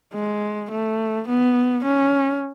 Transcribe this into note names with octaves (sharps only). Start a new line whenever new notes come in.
G#3
A3
B3
C#4